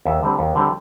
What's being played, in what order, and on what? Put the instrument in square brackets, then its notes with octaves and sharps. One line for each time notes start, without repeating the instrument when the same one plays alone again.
[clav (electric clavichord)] D#2 E5
D3 G3 C4
D#2
D3 G3 C4